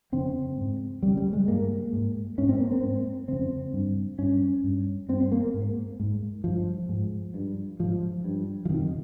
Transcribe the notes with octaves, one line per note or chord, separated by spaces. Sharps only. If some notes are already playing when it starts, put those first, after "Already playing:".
F2 C#3 C4
G#2
F2 C#3 G3
G3
G#3
G2 A#3
G#2
G#2 C#4
C4
A#3
C4
G#2
F2 C#3 C4
G2
G2 C#4
G2
G2 C4
C4
A#3
G#2
G#2
G2 F3
G#2
G2
G#2 F3
G2
F3
F2 C3 D#3